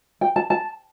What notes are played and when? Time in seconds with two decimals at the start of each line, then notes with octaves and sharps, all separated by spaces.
0.21 G5
0.36 A5
0.50 A5